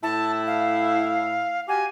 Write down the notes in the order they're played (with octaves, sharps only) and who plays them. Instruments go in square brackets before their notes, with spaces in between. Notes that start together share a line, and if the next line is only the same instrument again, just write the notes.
[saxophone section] A2 E4 [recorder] A5
[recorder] F5
[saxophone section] F#4 G4 [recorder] G#5